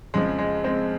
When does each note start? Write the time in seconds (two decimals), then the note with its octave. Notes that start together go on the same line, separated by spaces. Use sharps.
0.14 F2 C#3 F3 G#3
0.39 G#3
0.64 G#3 C4